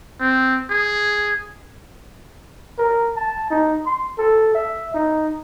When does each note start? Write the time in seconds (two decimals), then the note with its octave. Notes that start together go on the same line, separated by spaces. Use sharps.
0.20 C4
0.70 G#4
2.79 A#4
3.16 A5
3.51 D#4
3.87 C6
4.19 A4
4.55 E5
4.94 D#4